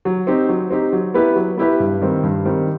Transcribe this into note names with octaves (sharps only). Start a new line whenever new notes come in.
F#3
C4 D#4 G4
F#3
C4 D#4 G4
F#3
B3 E4 G4 B4
F#3
B3 E4 G4 B4
G2
D#3 G3 C4
G2
D#3 G3 C4